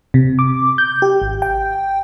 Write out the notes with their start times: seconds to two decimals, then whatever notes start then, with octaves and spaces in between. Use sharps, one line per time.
0.14 C3
0.39 D6
0.78 G6
1.02 G4
1.21 G#1
1.42 G5